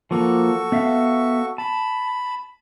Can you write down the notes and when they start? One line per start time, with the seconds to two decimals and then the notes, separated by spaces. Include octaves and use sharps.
0.11 F3 A#3 F#4 A4 C#6
0.72 B3 E5 F5
1.58 A5 B5